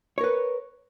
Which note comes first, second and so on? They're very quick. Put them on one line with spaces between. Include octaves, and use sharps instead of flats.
C#5 A#4 B4